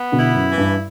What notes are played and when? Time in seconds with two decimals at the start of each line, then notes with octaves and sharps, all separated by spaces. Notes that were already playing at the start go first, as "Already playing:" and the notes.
Already playing: B3
0.12 B2 D3
0.19 E4
0.35 F#2
0.51 E3
0.58 G2